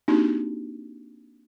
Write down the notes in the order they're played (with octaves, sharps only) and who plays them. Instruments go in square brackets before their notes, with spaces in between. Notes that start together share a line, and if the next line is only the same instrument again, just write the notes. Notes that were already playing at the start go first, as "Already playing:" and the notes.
[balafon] A#3 C4 D4 D#4 F#4 G4